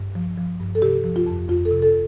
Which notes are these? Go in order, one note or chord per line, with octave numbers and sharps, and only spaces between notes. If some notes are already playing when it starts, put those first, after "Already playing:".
Already playing: G2
F3
F3
G2
A4
C3 G4
F3
F4
F2
F2 F4
A4
C3
A4